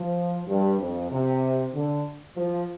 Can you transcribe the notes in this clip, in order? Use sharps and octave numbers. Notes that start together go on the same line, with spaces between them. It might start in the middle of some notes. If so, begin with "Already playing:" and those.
Already playing: F3
G2
F2
C3
D3
F3